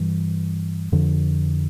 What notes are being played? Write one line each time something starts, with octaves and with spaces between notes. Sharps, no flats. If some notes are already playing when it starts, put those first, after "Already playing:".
Already playing: G2 E3 G3
F2 D3 F3